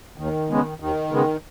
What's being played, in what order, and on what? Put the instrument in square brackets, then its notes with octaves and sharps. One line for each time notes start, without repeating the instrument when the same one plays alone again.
[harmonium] D#2 [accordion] D#3
[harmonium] C#3 G#3 B3
[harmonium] D#2 [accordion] D#3
[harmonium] C#3 G#3 B3